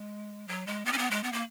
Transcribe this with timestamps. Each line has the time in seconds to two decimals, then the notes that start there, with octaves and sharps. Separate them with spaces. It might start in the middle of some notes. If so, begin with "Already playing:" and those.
Already playing: G#3
0.48 F#3
0.67 G#3
0.85 B3
0.93 C#4
0.98 B3
1.11 G#3
1.23 B3
1.33 A#3